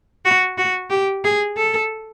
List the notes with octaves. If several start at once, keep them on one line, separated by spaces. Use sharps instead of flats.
F#4
F#4
G4
G#4
A4